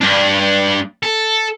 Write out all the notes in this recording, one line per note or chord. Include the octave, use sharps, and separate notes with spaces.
G2 D4
A4